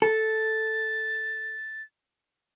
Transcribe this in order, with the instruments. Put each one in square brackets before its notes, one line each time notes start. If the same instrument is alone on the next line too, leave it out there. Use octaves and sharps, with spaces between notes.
[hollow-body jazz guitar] A4 [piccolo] A6